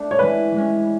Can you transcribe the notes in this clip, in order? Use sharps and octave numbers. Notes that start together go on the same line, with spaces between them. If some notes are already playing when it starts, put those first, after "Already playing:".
Already playing: A3 D4
C#5
E3 G#3 C#4 B4
E3 G#3 C#4